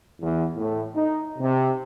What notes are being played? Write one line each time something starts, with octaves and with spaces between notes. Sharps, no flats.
E2
A2
D#4
C3